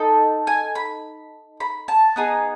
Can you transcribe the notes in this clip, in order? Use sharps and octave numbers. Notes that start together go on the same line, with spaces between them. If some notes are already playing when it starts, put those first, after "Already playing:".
Already playing: D#4 A4
G#5
B5
B5
A5
B3 D#4 G#4 G#5